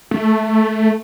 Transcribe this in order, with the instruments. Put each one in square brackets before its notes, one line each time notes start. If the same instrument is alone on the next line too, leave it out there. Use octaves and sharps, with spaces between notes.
[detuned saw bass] A3